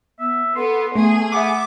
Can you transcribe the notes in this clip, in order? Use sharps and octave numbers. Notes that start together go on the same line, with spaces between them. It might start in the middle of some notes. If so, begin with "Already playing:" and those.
B3 E5
B3 A4 C6
A3 B3 G#4
B3 E5 F#5 D6